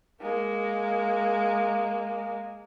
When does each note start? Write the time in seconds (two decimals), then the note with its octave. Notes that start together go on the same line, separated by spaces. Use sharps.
0.21 G#3 A#3